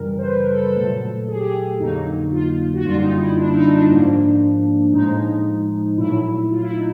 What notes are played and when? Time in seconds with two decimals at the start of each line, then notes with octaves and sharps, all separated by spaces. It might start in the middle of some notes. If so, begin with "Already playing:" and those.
Already playing: F#2 C#3 E3 G3 A#4
0.19 C5
0.24 B4
0.37 A#4
0.50 A4
0.62 A4
0.75 A#2 F#3 A3 A4
1.28 G#4
1.36 G4
1.44 G#4
1.80 F2 D3 F#3 A#3 D#4
2.33 F4
2.74 F#4
2.84 F#2 D3 G3 A#3 F4
3.02 D#4
3.20 E4
3.36 D4
3.46 E4
3.55 D#4
3.72 D4
3.89 G#2 F3 A#3
4.93 A2 F3 G#3 D#4
5.98 A#2 F#3 A3 E4
6.51 F4
6.62 E4
6.73 D#4